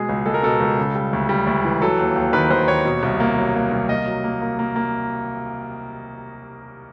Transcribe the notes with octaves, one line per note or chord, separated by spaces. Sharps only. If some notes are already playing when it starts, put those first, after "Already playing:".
Already playing: B2 G#3 G#4
C#2
G#3 A4
A#4
B2 A4
C#2
C#3
G3
D2
G3
D2
E3
F#3 A4
D#2
D#2
D#3 B4
D#3 C5
D#2 C#5
B2
C2
A#3
F#3
A#3
C2
A#3 D#5
F#3
A#3
A#3
A#3
A#3